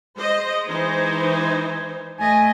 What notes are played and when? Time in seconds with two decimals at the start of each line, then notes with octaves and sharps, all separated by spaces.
0.19 G#3 C5 D#5
0.69 E3 D#4 C5 G#6
2.19 A3 D#5 G#5